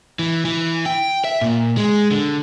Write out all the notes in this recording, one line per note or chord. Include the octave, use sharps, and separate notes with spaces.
E3
E3
G5
E5
A#2
G#3
D3